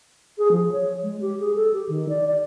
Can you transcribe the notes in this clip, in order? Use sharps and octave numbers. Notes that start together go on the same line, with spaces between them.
G#4
F3
C#5
G#3
G4
G#4
A4
G4
D#3
D5
D5